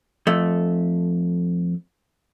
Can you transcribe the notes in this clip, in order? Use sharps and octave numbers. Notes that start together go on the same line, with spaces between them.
F2 A3